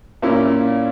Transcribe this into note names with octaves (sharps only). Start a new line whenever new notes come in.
A#2 A#3 C#4 E4